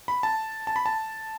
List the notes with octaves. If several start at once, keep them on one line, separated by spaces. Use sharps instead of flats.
B5
A5
A5
B5
A5